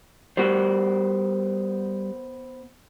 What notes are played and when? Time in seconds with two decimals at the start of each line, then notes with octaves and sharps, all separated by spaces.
0.37 G3 B3 F#4 A#4 C5